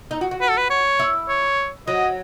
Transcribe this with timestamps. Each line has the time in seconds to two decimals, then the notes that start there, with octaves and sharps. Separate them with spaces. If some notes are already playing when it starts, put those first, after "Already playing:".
0.11 D#4
0.21 F#4
0.31 F#4
0.41 B4
0.50 A4
0.57 B4
0.70 C#5
0.99 E4
1.29 C#5
1.87 F#3 D#5